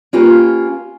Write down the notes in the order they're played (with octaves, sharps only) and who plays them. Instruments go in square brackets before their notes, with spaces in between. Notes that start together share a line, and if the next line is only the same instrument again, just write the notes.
[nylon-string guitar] A#3 C#4 F4 G4 B4